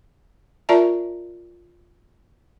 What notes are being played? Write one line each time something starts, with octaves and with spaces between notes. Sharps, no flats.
F4 A#4 D5 E5 A5 A#5